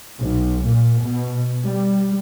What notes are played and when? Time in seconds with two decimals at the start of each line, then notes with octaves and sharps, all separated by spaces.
0.20 B1
0.66 A#2
1.02 B2
1.65 G3